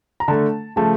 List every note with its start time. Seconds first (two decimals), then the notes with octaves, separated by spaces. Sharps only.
0.20 A#5
0.28 D3 A3 A5
0.76 C#3 F3 A3 A5